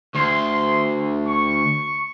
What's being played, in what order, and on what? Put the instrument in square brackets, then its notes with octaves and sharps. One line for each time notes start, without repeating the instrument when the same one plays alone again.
[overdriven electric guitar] D2 [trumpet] C6
[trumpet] C#6